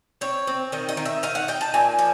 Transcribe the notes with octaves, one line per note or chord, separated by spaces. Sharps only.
C4 C#5
C4
D#3 D#5
D#5
D#3
E5
D#4 F5
F#5
D#4 G5
A5
A#2 G#5
F3